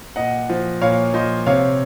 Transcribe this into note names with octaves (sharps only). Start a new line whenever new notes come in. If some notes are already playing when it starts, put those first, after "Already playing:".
A#2 D#5 F#5
F3
A#2 C#5 F5
F3 C5 D#5
C3 C#5 F5